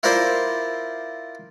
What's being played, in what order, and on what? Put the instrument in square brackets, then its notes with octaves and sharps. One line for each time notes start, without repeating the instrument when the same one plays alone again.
[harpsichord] E4 F4 A#4 C5 D5 E5